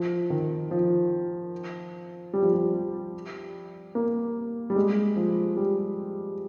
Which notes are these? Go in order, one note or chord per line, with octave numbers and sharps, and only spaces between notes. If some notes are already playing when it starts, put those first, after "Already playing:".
Already playing: F3
D#3
F3
G3
F3
G3
A#3
G3
G#3
F3
G3